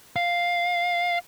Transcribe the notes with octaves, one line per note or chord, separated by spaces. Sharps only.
F5